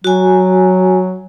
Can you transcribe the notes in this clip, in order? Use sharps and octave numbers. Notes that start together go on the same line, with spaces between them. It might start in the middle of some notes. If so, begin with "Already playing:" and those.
F#3 F#4 G#5